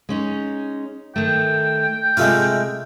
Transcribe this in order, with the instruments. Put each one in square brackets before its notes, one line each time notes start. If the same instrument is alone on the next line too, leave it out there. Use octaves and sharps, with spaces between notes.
[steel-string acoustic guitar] G#3 C#4 D#4
[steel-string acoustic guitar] D#3 A3 [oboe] G5
[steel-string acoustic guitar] C3 [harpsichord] G#3 A3 F4